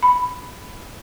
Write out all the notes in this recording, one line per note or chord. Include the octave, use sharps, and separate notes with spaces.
B5